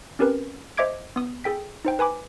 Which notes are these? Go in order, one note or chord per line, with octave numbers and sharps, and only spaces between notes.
C4 C#4 G4 A#4 B4
C5 D#5 E5 D6 G#6 D7
B3 D#6
G#4 A4 G5 B6
D#4 C5 G5
B4 G#5 B5 D6